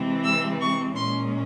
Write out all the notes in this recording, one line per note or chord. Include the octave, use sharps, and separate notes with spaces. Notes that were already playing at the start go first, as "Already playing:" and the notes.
Already playing: C3 E3 G#3 C4
E6
C#6
A#2 G#3 C#4 C6